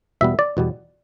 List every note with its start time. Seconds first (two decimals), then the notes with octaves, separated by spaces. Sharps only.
0.21 E2 B2 G3 B3 E5
0.39 D5
0.57 E2 B2 G3 B3